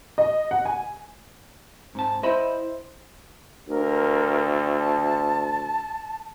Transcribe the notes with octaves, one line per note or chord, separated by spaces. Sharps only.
D#5
F#5
G#5
G#2 C4 A5
E4 C5 D#5 E5 B5
D2 A#4
A5